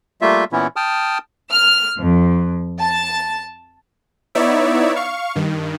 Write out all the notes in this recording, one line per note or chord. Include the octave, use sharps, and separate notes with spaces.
G3 A3 A#3 F4 E5
A#2 E3 B3 C#4 E4
G5 A5 D#6 F6
F6
F2
A5
B3 D#4 E4 C#5 D5 E5
F5 C#6
G2 D#3